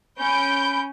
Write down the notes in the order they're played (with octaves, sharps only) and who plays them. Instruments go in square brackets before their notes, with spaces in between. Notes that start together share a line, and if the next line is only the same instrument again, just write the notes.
[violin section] C#4 G6 D7 [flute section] B5